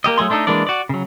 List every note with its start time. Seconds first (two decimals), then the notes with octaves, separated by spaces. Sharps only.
0.04 A#3 G4 D#5
0.18 F#3 A3 G#4 C6
0.30 A3 D4 D#4 A4 D#5
0.47 E3 G#3 A#3 D4 D5
0.67 F#4 D5
0.89 C#3 F#3